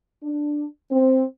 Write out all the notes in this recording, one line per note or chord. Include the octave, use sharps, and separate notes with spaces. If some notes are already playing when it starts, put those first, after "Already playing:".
D4
C4